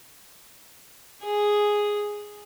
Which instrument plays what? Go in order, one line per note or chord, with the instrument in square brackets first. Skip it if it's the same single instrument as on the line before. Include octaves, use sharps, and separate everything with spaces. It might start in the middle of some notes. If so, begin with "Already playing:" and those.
[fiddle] G#4